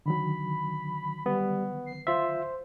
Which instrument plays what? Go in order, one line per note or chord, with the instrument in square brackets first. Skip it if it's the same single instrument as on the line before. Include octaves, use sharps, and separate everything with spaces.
[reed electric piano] D3 D#3 F#3 [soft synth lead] B5
[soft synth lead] G3 [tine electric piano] B3
[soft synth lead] C7
[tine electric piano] F4 E5 [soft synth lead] C5